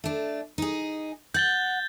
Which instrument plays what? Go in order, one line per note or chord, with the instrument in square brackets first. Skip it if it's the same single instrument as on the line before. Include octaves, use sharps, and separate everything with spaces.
[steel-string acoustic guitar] A3 D4
D#4 G#4
[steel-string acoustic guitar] F#5 [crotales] G6 A6 G7